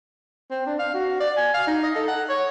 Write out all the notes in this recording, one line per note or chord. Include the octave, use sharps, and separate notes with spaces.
C4
D4
F5
F#4
D5
G#5
F5
D#4
D#5
A4
F#5
C#5